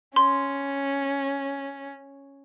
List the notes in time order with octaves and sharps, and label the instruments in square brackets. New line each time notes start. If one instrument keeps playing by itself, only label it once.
[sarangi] C#4 [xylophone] C6